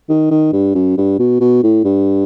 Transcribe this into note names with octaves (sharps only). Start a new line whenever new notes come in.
D#3
D#3
G2
F#2
G2
B2
B2
A2
G2